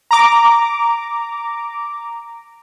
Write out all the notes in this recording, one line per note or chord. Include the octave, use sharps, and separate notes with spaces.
A#5 D6